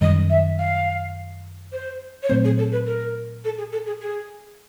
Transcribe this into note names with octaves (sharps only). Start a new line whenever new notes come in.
F#2 D#3 G3 D#5
E5
F5
C5
C#5
A#2 F#3 A3 C4 C5
G#4
A4
B4
A#4
A4
G#4
A4
G#4
G#4